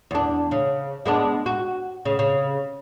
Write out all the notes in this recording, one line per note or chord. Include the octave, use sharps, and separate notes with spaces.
E2 D4
C#3
G#3 B3 D4
F#4
C#3
C#3